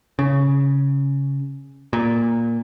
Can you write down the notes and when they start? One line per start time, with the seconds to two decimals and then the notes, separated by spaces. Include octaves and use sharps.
0.19 C#3
1.93 A#2